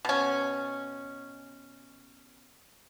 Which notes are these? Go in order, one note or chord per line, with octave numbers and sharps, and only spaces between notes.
B2 C#4